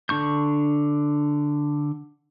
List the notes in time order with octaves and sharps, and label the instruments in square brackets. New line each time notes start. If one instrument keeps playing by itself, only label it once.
[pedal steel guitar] D3 D4 C#6 G6